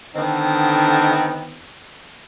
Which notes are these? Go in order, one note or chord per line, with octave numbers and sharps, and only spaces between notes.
D3 D#3 B3 C4 D#4